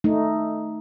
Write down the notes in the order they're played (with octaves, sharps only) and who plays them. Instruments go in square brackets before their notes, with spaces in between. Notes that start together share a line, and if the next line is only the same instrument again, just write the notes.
[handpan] A3 D#4